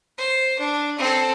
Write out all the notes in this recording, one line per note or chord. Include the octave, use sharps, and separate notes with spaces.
C5
D4
C4 A4